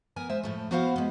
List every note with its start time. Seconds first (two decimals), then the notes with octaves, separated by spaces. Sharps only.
0.16 B3 A#4 G#5
0.29 G#3 C5 E5
0.43 A2 F3 A3
0.71 B3 E4 F#4 C5 F5 F#5
0.96 G#3 B3